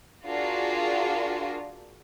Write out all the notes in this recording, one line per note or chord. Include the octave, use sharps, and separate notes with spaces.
D4 F4 F#4 G#4 A#4